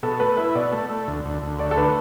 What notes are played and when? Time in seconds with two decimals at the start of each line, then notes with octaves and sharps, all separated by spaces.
0.03 B2 A4
0.20 A3 B4
0.37 E4 B4
0.55 B2 D5
0.73 A3
0.90 A3
1.08 D2
1.25 D2
1.42 D2
1.59 A3 D5
1.71 A4
1.77 D3 B4